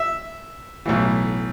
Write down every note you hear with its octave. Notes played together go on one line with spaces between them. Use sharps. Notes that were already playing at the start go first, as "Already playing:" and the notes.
Already playing: E5
B1 A2 E3